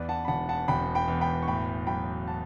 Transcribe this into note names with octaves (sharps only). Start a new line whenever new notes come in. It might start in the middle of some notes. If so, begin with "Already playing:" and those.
Already playing: E2 B4 D5
F#5 A5
B5
E1 F#5 A5
F#5 A5
E1 G5 B5
G5 B5
E2
G5 B5
C#6
A2 G5 B5
F#3 G5 B5
F#5 A5